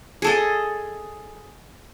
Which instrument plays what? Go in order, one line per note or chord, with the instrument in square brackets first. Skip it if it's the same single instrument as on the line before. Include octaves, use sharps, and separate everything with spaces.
[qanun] G#4 A4 D#5